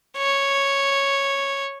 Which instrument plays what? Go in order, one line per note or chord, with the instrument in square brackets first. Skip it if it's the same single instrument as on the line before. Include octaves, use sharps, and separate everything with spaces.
[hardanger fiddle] C#5